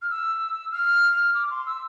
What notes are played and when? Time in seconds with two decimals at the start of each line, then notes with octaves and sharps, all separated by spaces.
0.02 F6
0.10 E6
0.72 F6
1.35 D6
1.50 C6
1.66 E6